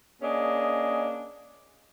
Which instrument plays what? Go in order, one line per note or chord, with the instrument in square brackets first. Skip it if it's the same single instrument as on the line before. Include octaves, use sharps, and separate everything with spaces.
[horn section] A#3 C#4 D4 G#4 D#5